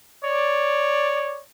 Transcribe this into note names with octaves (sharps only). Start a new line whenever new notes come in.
C#5 D5